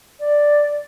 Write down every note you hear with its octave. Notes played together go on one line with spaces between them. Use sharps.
D5